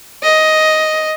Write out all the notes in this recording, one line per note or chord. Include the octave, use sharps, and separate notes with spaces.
D#5